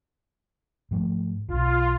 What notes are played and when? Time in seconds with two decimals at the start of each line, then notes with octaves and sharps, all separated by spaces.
0.91 G#2 F3 A3
1.49 D1 B1 F4